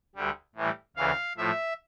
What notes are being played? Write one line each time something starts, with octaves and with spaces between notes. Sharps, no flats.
D2 D3 G3
A2 E3 G3
D2 C#3 E3 F5
A2 F3 E5